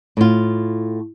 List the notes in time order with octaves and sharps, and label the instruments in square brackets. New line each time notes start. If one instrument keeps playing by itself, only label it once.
[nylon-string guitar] A2 F4